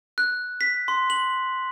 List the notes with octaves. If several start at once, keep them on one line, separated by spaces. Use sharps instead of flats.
F#6
B6
C6
F#7